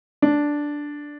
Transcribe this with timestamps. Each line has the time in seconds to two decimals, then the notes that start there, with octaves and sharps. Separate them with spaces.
0.22 D4